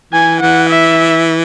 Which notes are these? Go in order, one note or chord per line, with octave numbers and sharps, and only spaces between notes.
E3 G#5
E3 F#5
E5